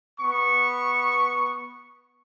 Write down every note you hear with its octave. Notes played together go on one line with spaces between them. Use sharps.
B3 C#6